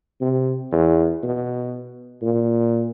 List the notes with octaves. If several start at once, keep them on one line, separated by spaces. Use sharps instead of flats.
C3
E2
B2
A#2